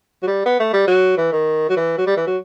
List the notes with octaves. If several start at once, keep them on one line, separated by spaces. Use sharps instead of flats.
F#3
G3
B3
A3
G3
F#3
E3
D#3
F#3
E3
F#3
G3
E3
F#3